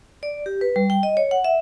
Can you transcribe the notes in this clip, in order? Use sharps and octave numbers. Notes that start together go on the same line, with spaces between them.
D5
G4
B4
G3
G5
D#5
C#5
F#5
E5